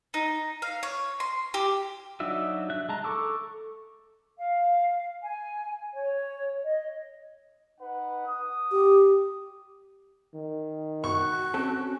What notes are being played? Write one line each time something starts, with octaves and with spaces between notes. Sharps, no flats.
D#4
F5
C#5
C6
G4
F#3 D4 D#4 F#4 E5
E5 F#6
G#3 A5 A#5
A4 C#6 D6 E6
F5
G#5
C#5
D#5
D#4 B4 F#5
D#6
G4
D#3
F#4 C#6
C4 C#4 A4